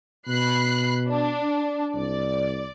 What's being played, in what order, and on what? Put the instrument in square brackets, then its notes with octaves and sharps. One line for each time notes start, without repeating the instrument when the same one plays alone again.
[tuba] B2 [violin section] B5 F#6 C7
[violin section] D4
[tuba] C2 [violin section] D5